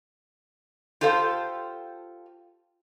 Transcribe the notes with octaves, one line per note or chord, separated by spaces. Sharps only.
F4 G4 A4 C5 F5